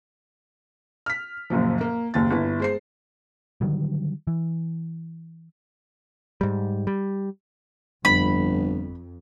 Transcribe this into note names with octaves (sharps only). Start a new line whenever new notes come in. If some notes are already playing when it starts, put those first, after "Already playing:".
F6 B6
F#1 F#2 A#2 F3
A#3
F#1 D#2 A6
G1 E4
G#3 C5 C7
D3 D#3 F#3 G3
E3
G#2 G3
G3
G1 F2 B5